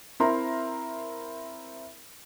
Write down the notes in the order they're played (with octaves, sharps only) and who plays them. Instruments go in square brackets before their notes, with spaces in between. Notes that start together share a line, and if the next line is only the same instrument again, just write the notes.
[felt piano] C4 E4 A#4 E5 A#5 C6